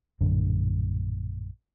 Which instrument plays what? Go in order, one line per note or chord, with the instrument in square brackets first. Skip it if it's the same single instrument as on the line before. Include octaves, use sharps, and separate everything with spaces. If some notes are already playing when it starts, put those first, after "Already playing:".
[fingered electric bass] A#1 F#2 A2 D3